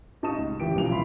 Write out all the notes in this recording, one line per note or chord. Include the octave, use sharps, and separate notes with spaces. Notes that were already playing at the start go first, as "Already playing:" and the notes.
A1 D#4 A5 C#6 D#6 E7
C#2
A1 E3 G4 D7
B1 E3 F3 F7
D#1 E4 B5 C6 B6